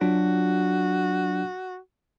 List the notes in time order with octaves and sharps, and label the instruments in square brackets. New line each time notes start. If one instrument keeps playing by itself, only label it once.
[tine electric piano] F#3 D4 F4 [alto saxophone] F#4